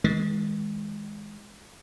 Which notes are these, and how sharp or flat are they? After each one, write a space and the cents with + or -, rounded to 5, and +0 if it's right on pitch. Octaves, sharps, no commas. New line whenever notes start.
E3 -45 G#3 +0